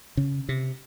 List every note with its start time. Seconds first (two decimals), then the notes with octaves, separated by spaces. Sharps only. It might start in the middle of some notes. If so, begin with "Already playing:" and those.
0.17 C#3
0.49 C3